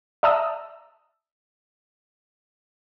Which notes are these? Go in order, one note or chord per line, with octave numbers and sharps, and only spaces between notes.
D5 E5 A5 A#5 D#6 E6